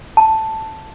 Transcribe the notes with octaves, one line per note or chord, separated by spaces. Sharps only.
A5